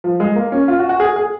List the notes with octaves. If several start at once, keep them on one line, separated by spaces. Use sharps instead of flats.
F3
G#3
A#3
C#4
F4
F#4
F#4
G#4
G#4